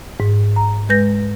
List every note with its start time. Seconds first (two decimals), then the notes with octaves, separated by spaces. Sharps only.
0.20 G#2
0.56 A#5
0.89 G#3 B4 G6 A#6